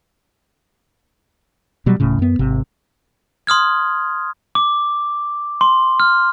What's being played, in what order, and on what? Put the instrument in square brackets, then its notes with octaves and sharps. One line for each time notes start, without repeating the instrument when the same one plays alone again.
[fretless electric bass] B2 F#3 G3
D1 A2 C#3
F#2 B3
G#1 C3
[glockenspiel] C6 D#6 F6 G#6
D6
C6
F6